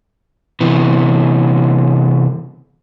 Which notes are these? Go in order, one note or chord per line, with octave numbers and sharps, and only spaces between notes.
C3 E3 B3